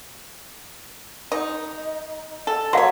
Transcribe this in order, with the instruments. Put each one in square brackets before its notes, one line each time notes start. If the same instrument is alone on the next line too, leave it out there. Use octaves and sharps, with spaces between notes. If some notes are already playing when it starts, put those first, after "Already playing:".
[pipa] D#4
A4
[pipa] F#3 C#5 [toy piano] F5 C6